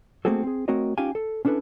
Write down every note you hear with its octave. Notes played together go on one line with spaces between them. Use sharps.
A3 A#3 C4 F#4 G#4 A4
C4 G#4
A3 C4 F#4 A#4 C#5 D#5
C#4 D#4 F4 G4 F5 G#5
A4
C#4 D4 E4 A4 B4